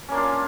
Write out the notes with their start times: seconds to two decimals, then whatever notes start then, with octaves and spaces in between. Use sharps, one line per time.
0.09 C#4
0.11 A#3
0.14 D4
0.17 F4